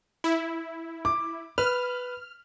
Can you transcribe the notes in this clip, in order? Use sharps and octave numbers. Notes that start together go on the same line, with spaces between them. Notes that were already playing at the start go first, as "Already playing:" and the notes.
E4
D6
B4 F6